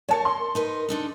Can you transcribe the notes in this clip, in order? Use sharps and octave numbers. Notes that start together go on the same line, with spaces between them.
A3 A#4 C#5 A5 C#7
C6
D#4 A#4 B4
D4 D#4 A4